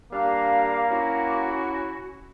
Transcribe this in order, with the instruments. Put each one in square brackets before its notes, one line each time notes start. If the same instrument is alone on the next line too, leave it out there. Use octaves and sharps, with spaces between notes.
[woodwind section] G3 D4 F5 [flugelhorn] A#3
[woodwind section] C#4 E4 F#4